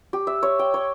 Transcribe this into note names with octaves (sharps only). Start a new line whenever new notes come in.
G4
E5
C#5
G5
C#5